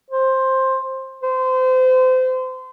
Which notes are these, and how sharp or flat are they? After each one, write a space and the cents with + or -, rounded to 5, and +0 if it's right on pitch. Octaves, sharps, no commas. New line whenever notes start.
C5 +10
C5 -30